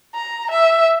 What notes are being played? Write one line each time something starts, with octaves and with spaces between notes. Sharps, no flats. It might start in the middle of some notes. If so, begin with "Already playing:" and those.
A#5
E5